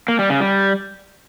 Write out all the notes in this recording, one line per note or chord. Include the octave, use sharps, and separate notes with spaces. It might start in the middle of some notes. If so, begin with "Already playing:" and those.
A#3
G3
C#3
G3